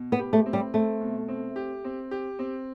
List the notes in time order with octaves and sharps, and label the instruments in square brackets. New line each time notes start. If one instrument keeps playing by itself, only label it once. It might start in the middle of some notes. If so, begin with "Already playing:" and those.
Already playing: [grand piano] B2
[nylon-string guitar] B3
[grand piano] G4
[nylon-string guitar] A3
[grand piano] C4
[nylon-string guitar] G3
[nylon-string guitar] A3 [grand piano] C4
[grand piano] B2
C4
G4
C4
G4
C4